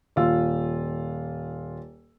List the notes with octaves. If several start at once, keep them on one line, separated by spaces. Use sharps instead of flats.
D#1 F4 E6